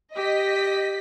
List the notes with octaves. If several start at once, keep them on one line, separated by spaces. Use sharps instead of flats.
G4 D#5 B6